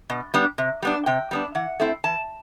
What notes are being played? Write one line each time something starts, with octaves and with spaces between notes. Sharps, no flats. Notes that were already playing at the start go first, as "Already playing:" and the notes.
B2
G3 B3 D4
C3
G3 B3 D4
C3 G5
G3 B3 D4
E3 F#5
A3 C4 E4
E3 A5